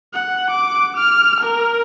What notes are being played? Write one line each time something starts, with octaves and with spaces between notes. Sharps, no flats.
F#5
D6
F6
A#4